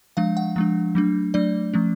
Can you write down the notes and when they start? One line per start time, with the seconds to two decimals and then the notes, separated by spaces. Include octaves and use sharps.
0.17 F3 G#3 D4 F5
0.37 F#5
0.56 F3 G#3 D4
0.95 F#3 A3 D4
1.34 F#3 A3 D4 D5
1.74 F3 A3 C#4